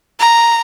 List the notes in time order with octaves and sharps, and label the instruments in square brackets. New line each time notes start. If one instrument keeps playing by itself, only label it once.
[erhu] A#5